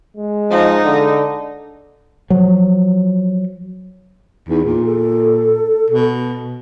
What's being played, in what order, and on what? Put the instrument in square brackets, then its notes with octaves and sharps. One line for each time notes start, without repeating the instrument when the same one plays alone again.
[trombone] G#3
[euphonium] F3 [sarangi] D#4
[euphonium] D3
[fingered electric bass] F3 F#3
[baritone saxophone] E2 [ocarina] D#4
[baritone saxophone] A#2 [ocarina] G#4
[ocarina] A4
[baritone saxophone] B2